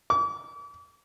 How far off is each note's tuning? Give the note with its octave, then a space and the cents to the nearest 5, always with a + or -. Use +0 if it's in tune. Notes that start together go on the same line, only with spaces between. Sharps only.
D6 -40